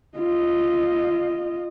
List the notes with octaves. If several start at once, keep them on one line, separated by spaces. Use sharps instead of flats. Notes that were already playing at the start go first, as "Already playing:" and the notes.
F4 D#5